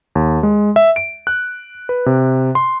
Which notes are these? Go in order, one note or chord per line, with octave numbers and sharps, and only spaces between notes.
D#2
G#3
E5
D7
F#6
B4
C3
C6